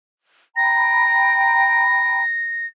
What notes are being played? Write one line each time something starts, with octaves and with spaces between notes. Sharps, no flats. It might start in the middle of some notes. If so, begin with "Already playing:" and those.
G5 A#5 B5 A#6